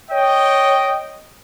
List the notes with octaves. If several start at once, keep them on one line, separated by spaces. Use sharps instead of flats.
C#5 D#5 G5